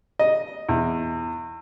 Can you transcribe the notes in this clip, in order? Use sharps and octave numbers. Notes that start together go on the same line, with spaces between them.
D#5
E2